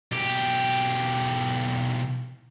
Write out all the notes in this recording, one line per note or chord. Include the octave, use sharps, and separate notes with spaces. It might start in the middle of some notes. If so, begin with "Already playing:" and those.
B1 G4